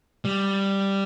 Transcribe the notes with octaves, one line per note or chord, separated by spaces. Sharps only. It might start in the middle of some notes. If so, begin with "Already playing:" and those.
G3